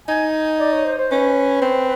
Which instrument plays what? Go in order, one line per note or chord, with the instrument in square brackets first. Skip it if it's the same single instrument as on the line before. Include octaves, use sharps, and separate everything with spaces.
[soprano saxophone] D#4 [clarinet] G#5
[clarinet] D5
C#5
C5
C5
[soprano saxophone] C#4 [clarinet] B4
[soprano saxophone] C4